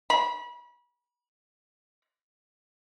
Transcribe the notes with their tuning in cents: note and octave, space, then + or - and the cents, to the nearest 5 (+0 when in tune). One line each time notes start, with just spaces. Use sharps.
B5 -35